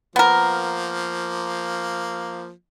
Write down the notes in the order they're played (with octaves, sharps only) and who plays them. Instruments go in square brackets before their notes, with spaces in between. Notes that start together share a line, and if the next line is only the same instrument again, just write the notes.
[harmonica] F3 A#3 [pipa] B3 A#4